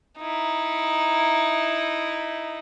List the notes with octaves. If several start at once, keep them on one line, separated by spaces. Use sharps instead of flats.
D#4 E4